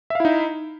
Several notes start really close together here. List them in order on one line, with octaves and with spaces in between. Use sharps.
E5 F5 E4 D#4